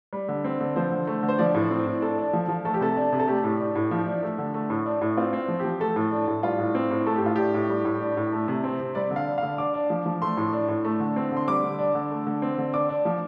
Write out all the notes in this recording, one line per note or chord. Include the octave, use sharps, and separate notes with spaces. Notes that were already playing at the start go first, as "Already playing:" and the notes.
G3
D3
C4
D3
F3 C5
D3
A3
D3
C5
F3 D5
A2
C4
A2
D4 A4
D4
F3
F3
A3 A4
G4
C3 A4
D4
C3
A4
A3 G4
A2
D4
A2
F3
D4
A3
D3
A3
A2
D4
A2
C4 F4
C4
F3
F3 G4
A3 A4
A2
D4
A2
G3 F4
A2
C4
A2
A3 A4
G4
A2 F4
D4 G4
A2
G3
A2
D4
A2
A3
C3
C4
C3
G3 D5
D3
F5
D4
F5
D3
D4 D6
D4
F3
F3
A3 C6
A2
D4
A2
A3
D3
C4
D3 C6
G3 D6
D3
D4
D3
A3
D3
C4
D3
D4 D6
D4
F3